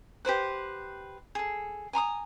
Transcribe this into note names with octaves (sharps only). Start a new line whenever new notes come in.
G4 B4 C5 F#5
G#4 A4
G#5 A#5 C6 D#6